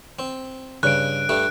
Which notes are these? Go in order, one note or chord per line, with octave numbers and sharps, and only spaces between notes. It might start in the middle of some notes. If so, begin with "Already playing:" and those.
C4
G2 C#3 F#6 D7
G2 G3 A3